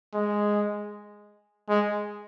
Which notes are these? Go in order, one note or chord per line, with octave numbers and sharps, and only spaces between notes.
G#3
G#3